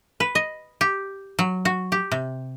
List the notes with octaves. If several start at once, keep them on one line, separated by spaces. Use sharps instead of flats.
B4
D#5
G4
F#3
F#4
G4
C3